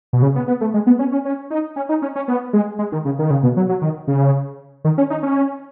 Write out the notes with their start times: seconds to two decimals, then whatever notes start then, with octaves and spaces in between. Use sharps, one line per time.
0.13 B2
0.22 C#3
0.35 B3
0.48 B3
0.61 A3
0.74 G#3
0.87 B3
0.99 C#4
1.12 C#4
1.25 C#4
1.50 D#4
1.76 C#4
1.89 D#4
2.02 C#4
2.16 C#4
2.28 B3
2.53 G#3
2.79 G#3
2.92 D#3
3.05 C#3
3.19 D#3
3.30 C#3
3.43 B2
3.57 F#3
3.69 F#3
3.82 D#3
4.08 C#3
4.84 D#3
4.98 C#4
5.10 D#4
5.23 C#4